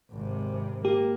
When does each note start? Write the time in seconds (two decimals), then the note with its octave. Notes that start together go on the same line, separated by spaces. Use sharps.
0.12 G#1 C3
0.85 A#3 G4